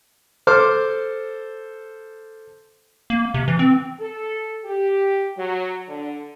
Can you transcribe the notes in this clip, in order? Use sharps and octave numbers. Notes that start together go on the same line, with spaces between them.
A4 C5 D6 F6
A#3
C3
E3
C4
A4
G4
F#3
D3